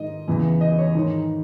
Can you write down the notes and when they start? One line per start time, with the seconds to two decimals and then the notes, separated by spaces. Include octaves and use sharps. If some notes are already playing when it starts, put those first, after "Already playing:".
Already playing: G#2 D#3 D#5
0.28 E2 C#3 E3
0.61 D#5
0.78 C#5
0.95 G#2 D#3